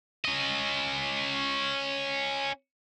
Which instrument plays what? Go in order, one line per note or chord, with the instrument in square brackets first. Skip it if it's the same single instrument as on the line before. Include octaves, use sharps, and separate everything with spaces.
[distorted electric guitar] C#4 D#5